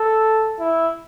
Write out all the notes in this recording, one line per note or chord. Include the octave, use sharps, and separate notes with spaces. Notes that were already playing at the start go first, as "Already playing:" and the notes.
Already playing: A4
E4